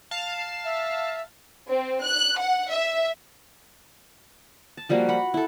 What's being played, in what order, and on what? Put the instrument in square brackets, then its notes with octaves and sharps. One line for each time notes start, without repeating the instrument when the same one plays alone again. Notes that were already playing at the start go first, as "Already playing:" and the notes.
[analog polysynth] F5 A5
[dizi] E5
[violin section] C4
F#6
F#5
E5
[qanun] A5
F3 G3 A#3 F#4
F#5 B5
E4 A4